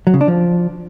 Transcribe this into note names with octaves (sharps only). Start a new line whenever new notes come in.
F#3
C#3
D4
F3